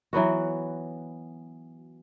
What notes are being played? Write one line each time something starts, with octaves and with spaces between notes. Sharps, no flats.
E3 F#3 B3 F#4